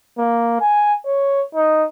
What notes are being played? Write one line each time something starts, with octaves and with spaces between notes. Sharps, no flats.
A#3
G#5
C#5
D#4